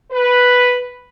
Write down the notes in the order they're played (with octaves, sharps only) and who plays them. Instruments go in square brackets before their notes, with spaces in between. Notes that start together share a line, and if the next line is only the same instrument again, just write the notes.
[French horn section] B4